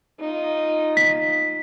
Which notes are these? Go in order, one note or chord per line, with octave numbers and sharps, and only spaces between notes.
D#4 F4
B6